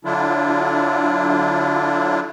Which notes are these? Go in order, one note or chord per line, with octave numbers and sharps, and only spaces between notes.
D3 F#3 D4 E4 F4